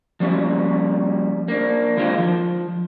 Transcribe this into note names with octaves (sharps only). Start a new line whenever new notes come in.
F3 G3 A#3 C#4
A#3 D4
D3 D#3 G#3 C4 F4
F3